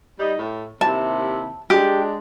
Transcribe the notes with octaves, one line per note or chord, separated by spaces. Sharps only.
G3 D#4
A2
D#2 C3 E4 A5
G#3 D4 G4